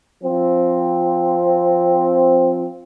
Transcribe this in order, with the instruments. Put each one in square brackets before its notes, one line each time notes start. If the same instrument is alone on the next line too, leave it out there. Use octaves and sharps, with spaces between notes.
[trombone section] F3 C4